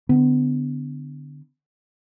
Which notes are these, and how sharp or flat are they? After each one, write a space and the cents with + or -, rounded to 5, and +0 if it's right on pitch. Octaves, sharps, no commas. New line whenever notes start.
D3 +0 B3 +30